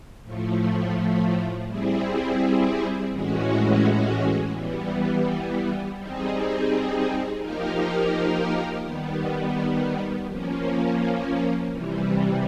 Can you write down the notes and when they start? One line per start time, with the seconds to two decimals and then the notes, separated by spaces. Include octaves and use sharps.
0.23 A2 F3 A3
1.66 G3 C4 E4 G#4
3.10 A2 E3 G#3 C#4 F#4
4.53 E3 G3 B3
5.96 G3 C4 D#4 G#4
7.40 F3 A#3 D#4 G4 A#4
8.83 D#3 G3 B3
10.27 F3 A#3 C#4
11.71 C3 E3 G3